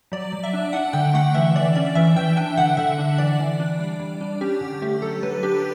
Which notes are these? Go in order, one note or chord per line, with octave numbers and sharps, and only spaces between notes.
F#3 D5
F#3
E5
D4
D4 F#5
D3 G5
A3 F#5
E3 E5
E3 D5
C#4 D5
E3 E5
E3 G5
D4 G5
D3 F#5
D3 E5
D4
E3 D5
E3
D4
G3
G3
D4
C#4 G4
D3
A3 G4
F#3 A4
F#3 B4
D4 G4